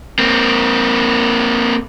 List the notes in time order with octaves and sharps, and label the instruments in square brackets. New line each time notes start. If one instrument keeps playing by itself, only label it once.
[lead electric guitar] A#3 C4